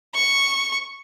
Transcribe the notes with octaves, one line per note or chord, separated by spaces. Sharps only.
C#6